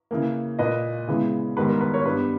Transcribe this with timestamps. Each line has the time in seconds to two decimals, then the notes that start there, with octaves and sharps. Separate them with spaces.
0.11 C#3 E3 A#3
0.59 A#2 A#3 B4 D#5
1.08 C#3 E3 G#3 B3
1.56 G#2 D#3 G3 B3 B4
1.69 A#4
1.81 B4
1.94 A#4 C#5
2.06 G2 G3 B3 B4